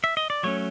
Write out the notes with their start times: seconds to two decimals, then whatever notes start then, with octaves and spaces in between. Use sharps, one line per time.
0.04 E5
0.17 D#5
0.30 D5
0.43 F#3 A3 C#4 C#5